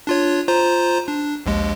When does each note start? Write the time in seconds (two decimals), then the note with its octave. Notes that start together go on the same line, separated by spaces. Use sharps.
0.07 D4 F4 C#5
0.48 F4 C5 A#5
1.08 D4
1.46 A#1 D#2 G#3